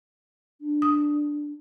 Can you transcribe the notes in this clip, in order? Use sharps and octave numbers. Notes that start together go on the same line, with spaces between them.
D4
D#6